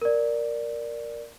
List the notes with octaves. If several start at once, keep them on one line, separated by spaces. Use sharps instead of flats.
A#4 D5